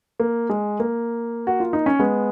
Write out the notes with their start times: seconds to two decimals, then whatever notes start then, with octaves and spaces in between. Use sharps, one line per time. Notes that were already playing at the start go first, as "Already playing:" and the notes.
0.20 A#3
0.49 G#3
0.80 A#3
1.47 F#4
1.60 F4
1.73 D#4
1.86 C#4
1.99 G#3 B3